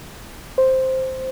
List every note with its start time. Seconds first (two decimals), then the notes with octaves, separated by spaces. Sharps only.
0.58 C5